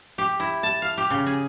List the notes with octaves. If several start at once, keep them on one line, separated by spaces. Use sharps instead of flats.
G4
E4
A5
F5
G4
C#3
G#4